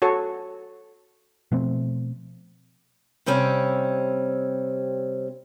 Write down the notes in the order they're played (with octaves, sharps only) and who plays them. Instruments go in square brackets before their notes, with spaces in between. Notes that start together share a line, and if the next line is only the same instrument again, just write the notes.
[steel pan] F#4 A4 C#5
[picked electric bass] B2 F3 A3 C4
[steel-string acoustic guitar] C3 G3 C4 C#4